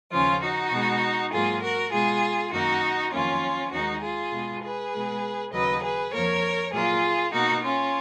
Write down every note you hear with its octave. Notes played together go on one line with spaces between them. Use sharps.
D#2 C#3 F3 C#4 F4
D#4 F#4
B2 G#3
G#2 F#3 A#3 F4 G#4
F#4 A#4
B2 G#3 F4 G#4
F#2 D#3 A#3 D#4 F#4
F2 D#3 F#3 A#3 C#4 F4
D#2 D#3 G#3 D#4 F#4
F4 G#4
B2 G#3
G#4 B4
B2 G#3
D#2 C#3 F#3 B4 D#5
G#4 B4
F2 F3 A#3 A#4 C#5
A#2 F#3 A#3 F4 G#4
B2 A#3 D#4 F#4
C#4 F4